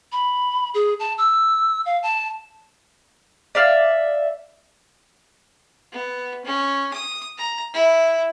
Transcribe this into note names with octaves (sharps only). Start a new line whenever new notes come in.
B5
G#4
A5
E6
F5
A5
D5 E5 F5
B3
C#4
D#6
A#5
E4